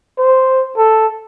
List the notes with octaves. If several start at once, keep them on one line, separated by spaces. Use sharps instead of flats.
C5
A4